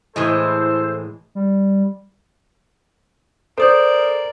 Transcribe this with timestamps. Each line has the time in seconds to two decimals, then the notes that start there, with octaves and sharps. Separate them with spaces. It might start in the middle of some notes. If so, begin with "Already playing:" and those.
0.16 A2 E3 G#3 A4 C5
1.35 G3
3.58 A4 A#4 C5 D5 D#6 G6